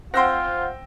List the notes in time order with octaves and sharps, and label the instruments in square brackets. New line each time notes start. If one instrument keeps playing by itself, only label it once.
[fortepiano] C4 C6 [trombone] F4 [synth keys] F#5 [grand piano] G5 E6 A#6